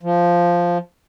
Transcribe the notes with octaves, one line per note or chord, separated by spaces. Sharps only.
F3